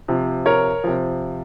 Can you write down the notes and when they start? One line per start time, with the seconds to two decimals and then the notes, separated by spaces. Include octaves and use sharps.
0.08 C3 F3
0.46 A#4 C#5
0.84 C3 F3